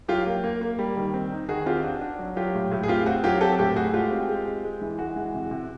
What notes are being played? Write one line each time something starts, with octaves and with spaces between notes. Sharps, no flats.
F#3 F4 G4
A#3
A#3
A#3
G3
D#3
C4
D#4
D#3 F#4 G#4
C4 F4 G4
D4 F#4
D4
F#3
F#3 F4 G4
A2
A2
G#4
C4 F4 G4
C4 F#4
F#3 F4 G4
C4 G4 A4
A2 G4 A4
A3 F#4 G#4
G#3 F4 G4
C4
G#3
C4
G#3
E3
G#3 F#4
E3
C3
C3